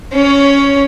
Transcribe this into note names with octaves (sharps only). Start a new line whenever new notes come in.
C#4 C#5